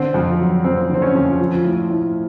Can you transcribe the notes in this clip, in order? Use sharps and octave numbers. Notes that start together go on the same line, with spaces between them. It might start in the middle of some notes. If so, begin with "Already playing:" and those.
Already playing: D3 C4
F2
F#3
F2 C4
D3 C4
C#4
F2
F3
A2
A2